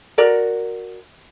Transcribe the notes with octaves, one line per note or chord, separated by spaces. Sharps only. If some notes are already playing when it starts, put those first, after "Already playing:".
F#4 A#4 D5 A#5